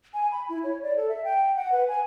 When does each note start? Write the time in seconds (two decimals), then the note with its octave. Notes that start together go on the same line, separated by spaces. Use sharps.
0.14 G#5
0.32 B5
0.49 E4
0.64 C#5
0.82 D5
0.97 A4
1.09 E5
1.24 G5
1.56 F#5
1.72 B4
1.88 G#5